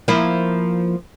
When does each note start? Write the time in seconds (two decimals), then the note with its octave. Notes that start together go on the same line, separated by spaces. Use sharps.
0.08 F3 A#3 E4